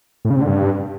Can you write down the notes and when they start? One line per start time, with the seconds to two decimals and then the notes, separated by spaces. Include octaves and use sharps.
0.25 A2
0.30 C#3
0.36 C3
0.41 D3
0.47 G2